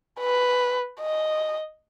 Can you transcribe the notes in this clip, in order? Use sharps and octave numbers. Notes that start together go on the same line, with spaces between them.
B4
D#5